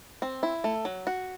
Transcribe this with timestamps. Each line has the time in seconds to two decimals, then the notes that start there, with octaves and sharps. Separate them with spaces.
0.22 C4
0.43 E4
0.64 A3
0.85 F#3
1.07 F#4